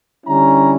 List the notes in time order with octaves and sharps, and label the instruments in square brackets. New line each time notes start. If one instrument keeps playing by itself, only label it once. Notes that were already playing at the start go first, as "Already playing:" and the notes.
[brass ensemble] D3 G3 C#4 E4 A#5